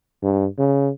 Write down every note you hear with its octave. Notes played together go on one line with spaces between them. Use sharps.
G2
C#3